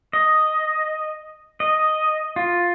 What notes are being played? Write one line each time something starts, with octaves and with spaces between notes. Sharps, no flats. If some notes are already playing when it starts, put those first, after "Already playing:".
D#5
D#5
F4